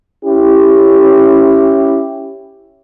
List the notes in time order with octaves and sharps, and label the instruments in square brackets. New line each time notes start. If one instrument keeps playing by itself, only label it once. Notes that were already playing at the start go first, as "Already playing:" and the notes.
[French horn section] C#4 E4 G4